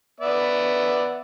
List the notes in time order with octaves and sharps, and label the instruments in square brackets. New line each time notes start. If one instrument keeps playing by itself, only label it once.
[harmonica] B3 D5 E5